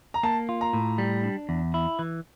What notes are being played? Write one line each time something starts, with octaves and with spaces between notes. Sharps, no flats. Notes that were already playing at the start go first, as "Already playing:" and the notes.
A#5
A#3 A5
F4
A#5
A2
G3
D4
E2
E4
E3